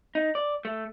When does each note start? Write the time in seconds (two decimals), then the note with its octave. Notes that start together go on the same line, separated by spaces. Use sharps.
0.15 D#4
0.35 D5
0.65 A3